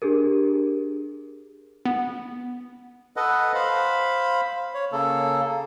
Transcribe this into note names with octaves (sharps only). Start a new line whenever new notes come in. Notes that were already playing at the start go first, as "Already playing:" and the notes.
D4 G4 G#4 A#4
B3
A4 B4 D#5 F#5
C5 F5 B5
C#5
C#3 A#3 A4